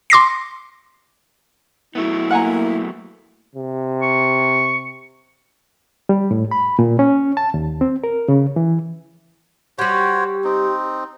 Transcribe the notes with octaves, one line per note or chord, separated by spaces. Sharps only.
C6 D6 A#6 C7
F#3 A3 B3 E4
A#3 F#5 G#5 A#5
C3
C#6
G3
A2
B5
A#2
C#4
A5
D#2
C4
A#4
C#3
E3
G3 F#4 G4 C5 C#5
C4 D#4